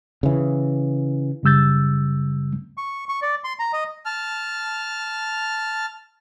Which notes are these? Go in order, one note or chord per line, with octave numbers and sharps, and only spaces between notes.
C#3 E3
F#2 C#3 G3 E6 G6 A6
C#6
C#6
D5
C6
A#5
D#5
A5 F6